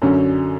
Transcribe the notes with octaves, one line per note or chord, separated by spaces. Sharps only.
F#2 D3 F#3 C#4